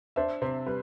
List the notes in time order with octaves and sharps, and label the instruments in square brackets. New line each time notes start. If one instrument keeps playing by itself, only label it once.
[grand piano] D4 [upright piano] C5 E5
[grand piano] C3 [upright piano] C5
[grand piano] G3 [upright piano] B4